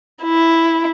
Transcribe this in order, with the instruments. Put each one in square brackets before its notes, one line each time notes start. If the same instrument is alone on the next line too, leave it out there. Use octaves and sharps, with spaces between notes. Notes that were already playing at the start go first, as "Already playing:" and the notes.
[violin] E4